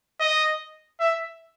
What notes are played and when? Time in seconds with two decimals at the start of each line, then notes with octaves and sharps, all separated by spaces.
0.20 D#5
1.00 E5